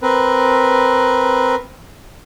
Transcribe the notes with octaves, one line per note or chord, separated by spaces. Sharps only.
C4 A#4 B4